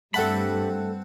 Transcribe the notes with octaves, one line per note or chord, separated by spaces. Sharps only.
G2 G3 A3 C4 A4 F#5 A5 B5